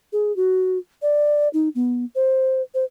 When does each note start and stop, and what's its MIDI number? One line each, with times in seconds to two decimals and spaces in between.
0.13 0.35 68
0.36 0.78 66
1.02 1.48 74
1.53 1.69 63
1.75 2.05 59
2.15 2.62 72
2.74 2.85 72